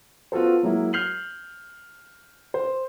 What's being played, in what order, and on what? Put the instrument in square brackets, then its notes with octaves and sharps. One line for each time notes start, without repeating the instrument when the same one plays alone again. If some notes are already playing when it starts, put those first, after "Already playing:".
[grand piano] B3 F4 F#4 A4 C5
F#3 G#3 A#3 E4
F6 G6 C7 F7 F#7
C5